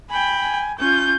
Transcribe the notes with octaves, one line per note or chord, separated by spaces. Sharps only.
G5 G#5 B5
G#5
C#4 F4 G6